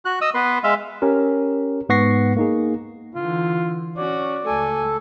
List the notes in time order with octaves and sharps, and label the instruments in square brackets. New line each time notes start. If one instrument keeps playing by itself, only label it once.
[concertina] F#4 F#6
D#5 D#6 E6
B3 B4 C6
G#3 E5 F5 C6
[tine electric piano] C#4 G4 A#4
G#2 B3 F#5 C#6 A#6 C7
A#3 D#4 G#4
[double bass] D3 E3 [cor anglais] F4
[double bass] C#4 [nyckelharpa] F#4 [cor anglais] D5
[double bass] C#2 A3 [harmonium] A4 [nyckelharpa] G#5